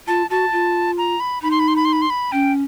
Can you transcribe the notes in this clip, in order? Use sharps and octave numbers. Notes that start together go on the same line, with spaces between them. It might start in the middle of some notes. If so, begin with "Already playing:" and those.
F4 A5
F#4 A5
F4
A#5
B5
D#4 B5
C6
B5
C6
B5
C6
B5
C6
B5
C#4 G5